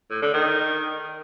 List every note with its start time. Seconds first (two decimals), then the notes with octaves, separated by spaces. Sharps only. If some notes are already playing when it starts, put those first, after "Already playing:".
0.10 A2
0.22 D3
0.34 D#3